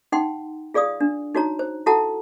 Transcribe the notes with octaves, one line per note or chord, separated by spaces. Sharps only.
D#4 F#5 G5 C6
F4 G#4 D5 F5 D#6
D4
D#4 F#4 C#5 A#5
C5
E4 F#4 A4 F#5 A5 A#5